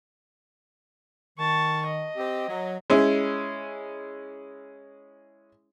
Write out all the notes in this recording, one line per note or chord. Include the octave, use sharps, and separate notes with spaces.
D#3 A5 C#6
D#5
C4 G4
F#3
G#3 C#4 E4